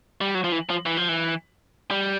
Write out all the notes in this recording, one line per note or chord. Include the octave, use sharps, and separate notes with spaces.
G3
F#3
F3
E3
F3
E3
F3
E3
G3